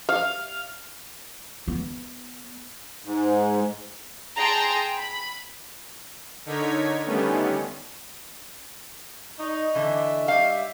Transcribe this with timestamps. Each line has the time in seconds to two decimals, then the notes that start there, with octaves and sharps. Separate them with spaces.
0.09 F5
1.68 B3
3.05 G#2
4.36 G#4 G5 A5 A#5 C6
4.98 B5
6.46 D3 D#4 A#4 C#5 G#6 B6
7.04 D3 D#3 G3 A3 B3 C#4
9.39 D#4 D5 D#5 C#6
9.75 D3 E3 E5
10.28 G3 F5